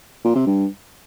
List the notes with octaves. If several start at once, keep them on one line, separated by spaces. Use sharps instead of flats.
A#2
C3
G2